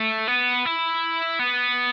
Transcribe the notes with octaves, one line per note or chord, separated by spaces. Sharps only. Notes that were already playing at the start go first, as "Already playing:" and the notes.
Already playing: A3
B3
E4
B3